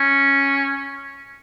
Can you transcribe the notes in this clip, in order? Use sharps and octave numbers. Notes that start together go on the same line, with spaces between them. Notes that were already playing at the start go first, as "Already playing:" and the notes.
Already playing: C#4